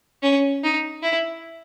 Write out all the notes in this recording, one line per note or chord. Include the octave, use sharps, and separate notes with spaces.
C#4
D#4
E4